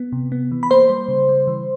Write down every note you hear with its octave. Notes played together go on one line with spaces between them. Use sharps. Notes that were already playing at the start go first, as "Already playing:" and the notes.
Already playing: B3
C3
B3
E3
B5
A#3 C5 C6
G3
C#3
G3
E3